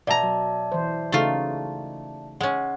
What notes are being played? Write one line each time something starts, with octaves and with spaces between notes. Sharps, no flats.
B2 D5 E5 A5 A#5
F#3
E3 C5
C#3 A3 D#4 F4 F#4
G#3 C#4 F#5